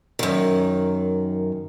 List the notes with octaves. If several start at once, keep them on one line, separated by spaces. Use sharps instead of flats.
F#2 D#3